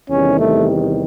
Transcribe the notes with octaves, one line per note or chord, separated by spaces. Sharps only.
E2 C3 D#3 G3 C#4
A3